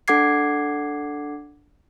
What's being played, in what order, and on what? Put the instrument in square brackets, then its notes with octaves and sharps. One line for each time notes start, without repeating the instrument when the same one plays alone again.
[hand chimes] D4 A4 F#5 D6 G#6 C7